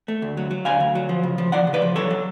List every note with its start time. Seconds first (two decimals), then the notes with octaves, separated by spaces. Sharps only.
0.08 A3
0.22 D2
0.37 F#3
0.51 F#3
0.65 D2 F5 G#5
0.80 D2
0.95 F#3
1.09 F3
1.23 C#3
1.38 F3
1.52 F3 D5 F#5
1.67 C#3
1.74 B4 D5
1.82 F3
1.96 F#3 A4 C#5
2.10 F#3